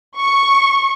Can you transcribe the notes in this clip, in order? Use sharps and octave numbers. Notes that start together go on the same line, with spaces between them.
C#6